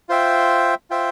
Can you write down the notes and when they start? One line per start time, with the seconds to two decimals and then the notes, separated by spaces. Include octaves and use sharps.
0.09 F4 C5 E5 G5
0.90 F4 C5 E5 G5